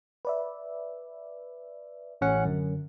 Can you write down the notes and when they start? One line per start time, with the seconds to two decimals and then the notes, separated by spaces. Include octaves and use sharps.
0.25 B4 D5 E5
2.21 A1 C#4 F#5
2.45 F#2 D3